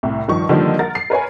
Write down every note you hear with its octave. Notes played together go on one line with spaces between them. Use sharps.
C2 A2
G2 D#3 F3 C#6
D3 D#3 F3 G3 A#3
A#4 F#5 A6
C7
A#4 B4 C#5 G#5